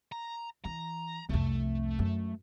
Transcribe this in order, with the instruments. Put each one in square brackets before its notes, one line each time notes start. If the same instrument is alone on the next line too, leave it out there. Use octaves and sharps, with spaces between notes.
[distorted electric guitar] A#5
[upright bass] E3 [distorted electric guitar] A#5
[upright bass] C2 F2 [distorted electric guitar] A3
[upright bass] F#2